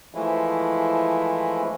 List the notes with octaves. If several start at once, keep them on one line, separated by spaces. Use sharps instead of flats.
E3 F3 G#3 A3 E4